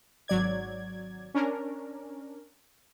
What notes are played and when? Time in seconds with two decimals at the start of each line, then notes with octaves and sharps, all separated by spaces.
0.28 G#1 F#3 D5 G#6
1.34 C#4 D4 A#4